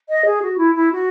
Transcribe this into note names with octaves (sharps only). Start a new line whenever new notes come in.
D#5
G#4
F#4
E4
E4
F#4